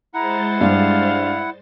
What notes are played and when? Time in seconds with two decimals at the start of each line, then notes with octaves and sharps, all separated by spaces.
0.14 G#3 E4 C5 F#5 A#5 A6
0.61 G2 F5